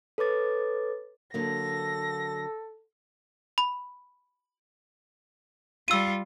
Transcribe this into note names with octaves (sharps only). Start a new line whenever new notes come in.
A4 B4 C#5 D6 A6
D3 F#3 A#3 A4 A#6
B5
G3 F4 E6 D#7